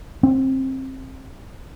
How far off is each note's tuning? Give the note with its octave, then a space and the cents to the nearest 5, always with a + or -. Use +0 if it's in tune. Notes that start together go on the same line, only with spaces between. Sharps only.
C4 +20